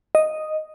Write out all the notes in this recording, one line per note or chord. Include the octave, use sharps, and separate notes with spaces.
D#5